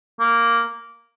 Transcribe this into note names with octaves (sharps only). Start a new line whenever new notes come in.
A#3